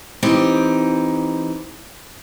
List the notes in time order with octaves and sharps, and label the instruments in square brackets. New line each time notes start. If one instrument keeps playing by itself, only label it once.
[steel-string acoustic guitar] E3 C4 D#4 G4